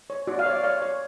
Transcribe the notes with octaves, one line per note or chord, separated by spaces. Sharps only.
C#5
F#4 D5
F5
C#5 D5
C#5 F5
C#5